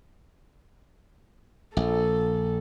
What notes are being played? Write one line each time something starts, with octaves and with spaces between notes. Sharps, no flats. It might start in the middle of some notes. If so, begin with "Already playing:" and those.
A#1 A4